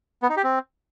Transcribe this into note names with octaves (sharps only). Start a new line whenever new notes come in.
B3
D#4
G4
C4